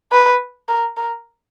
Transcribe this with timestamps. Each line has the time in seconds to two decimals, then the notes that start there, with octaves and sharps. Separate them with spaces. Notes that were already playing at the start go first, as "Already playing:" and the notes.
0.12 B4
0.69 A#4
0.97 A#4